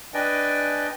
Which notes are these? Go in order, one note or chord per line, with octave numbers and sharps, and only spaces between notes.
D4 B4 D5 D#5 G5 G#5